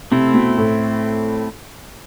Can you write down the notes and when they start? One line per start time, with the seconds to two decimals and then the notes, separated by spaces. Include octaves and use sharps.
0.11 C3 A3 C4 E4
0.34 B2
0.57 A2